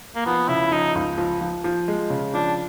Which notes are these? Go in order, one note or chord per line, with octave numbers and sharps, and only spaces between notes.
A#3
F3 B3
C#3 E4
F3 D#4
C#2
F3
F3
F3
G#3
C#3
F3 D4